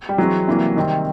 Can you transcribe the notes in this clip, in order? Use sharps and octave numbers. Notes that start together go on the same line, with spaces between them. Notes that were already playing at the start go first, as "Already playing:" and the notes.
G3 G4
E3 F#3 G#3 C4 F#4
C3 E3 G3 A#3
C3 D#3 G3 C4